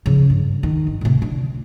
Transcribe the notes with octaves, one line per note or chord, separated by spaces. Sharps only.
C#3 F3
G2
D#3
G1
A2 C3
D3